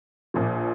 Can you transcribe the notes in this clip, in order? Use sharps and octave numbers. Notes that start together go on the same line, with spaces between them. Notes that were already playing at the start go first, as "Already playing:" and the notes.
A#1 A#2 F3